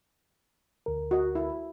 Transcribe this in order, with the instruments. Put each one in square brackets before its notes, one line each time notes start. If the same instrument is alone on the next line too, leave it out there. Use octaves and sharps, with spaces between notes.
[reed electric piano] D2 A#4
[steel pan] F#4 D#5
E4